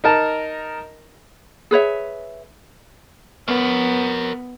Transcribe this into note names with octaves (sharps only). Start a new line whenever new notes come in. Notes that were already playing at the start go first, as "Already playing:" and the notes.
D#4 A#4 A5
G#4 B4 C#5 E5
B3 A#4 C#5